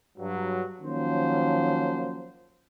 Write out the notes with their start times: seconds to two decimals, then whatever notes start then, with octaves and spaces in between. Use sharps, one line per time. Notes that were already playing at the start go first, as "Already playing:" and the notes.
0.18 G2 F#3
0.82 D#3 F3 F#3 A#3 C#4 C5